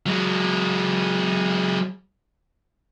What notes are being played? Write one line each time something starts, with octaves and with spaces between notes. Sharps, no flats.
F#3 G#3